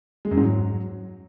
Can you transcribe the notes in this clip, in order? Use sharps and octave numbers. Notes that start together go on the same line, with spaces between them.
G#3
F#2
G#2
F#3